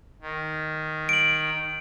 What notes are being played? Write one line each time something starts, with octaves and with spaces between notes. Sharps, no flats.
D#3
D7 F#7